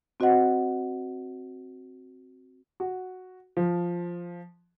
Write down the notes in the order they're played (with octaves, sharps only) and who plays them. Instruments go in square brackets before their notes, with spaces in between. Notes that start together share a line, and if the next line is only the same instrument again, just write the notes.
[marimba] C4 F#4 C5 D#5 F#5
[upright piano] F#4
F3